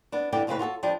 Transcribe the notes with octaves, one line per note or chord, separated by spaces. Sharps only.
B3 D4
G2 D3 E3 G3 D5 G5
F2 A2 C#3 C4 C#4 B4
F4 F#4 G#4 A4
F3 G3 D4 D#5 G5